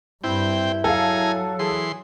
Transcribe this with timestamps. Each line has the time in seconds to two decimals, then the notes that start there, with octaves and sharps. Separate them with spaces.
0.24 G2 C4 E4 G5
0.84 F#3 G#4 A4 F5 G#5 A#5
1.59 E3 G#4 C6